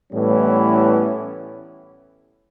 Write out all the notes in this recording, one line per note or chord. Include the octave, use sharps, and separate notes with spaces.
A2 E3 G3 B3 C#4